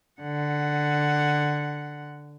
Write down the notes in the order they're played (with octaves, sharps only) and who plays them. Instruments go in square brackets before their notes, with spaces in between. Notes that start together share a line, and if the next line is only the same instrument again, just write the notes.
[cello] D3 F#5